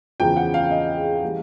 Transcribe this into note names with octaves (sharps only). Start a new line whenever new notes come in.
E2 C#3 F3 G#3 G5
F#5
F5
D#5
E3 G3 A#3